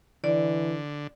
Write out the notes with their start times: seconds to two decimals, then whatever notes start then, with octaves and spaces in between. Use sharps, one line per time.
0.24 D3 E3 D5